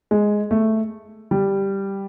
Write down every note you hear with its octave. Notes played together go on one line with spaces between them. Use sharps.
G#3
A3
G3